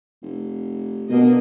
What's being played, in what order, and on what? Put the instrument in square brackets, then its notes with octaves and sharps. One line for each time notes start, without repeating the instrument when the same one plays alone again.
[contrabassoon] F1
[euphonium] B2 [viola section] A#3 D4 D#5 [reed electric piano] B3